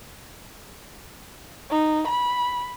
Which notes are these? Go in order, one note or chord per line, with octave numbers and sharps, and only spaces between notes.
D#4
B5